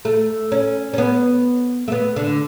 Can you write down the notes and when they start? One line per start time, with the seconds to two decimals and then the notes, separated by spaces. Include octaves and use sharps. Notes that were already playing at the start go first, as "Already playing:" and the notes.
0.05 A3
0.52 C#4
0.94 C#4
0.98 B3
1.88 A3
1.92 B3
2.16 D3